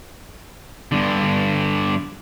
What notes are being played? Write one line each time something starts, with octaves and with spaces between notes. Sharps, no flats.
G2 D3